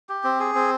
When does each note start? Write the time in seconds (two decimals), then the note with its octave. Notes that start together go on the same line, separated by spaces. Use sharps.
0.09 G4
0.24 C4
0.40 G#4
0.55 C4